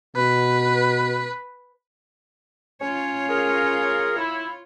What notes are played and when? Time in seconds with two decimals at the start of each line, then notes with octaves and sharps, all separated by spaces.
0.16 B2 B4
2.81 C#4 F4 C#5
3.29 G#4 A#4
4.17 E4